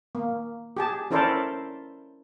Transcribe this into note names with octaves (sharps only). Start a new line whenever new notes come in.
A#3
G4 G#4 A5
C#4 E4 A4 A#4 C5 D5